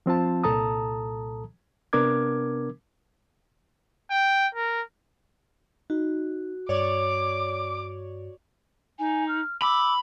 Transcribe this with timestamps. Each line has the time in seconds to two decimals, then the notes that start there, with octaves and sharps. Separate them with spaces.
0.06 F3 C4 F4 A5
0.44 C2 A#2 A4 A5 A#5 D#6
1.93 C3 B3 D4 A#4 D6 G#6
4.11 G5
4.55 A#4
5.90 D#4 F#4
6.69 G2 C#5 D5 D6
8.99 D#4 G#5
9.28 F6
9.62 B5 D6 E6